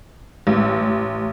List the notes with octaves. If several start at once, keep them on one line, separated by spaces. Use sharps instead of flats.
A1